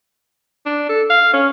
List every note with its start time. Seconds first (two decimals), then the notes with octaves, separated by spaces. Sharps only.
0.66 D4
0.89 A4
1.10 F5
1.34 C#4